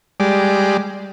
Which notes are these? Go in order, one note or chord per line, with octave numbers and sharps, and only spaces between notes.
G3 G#3 D5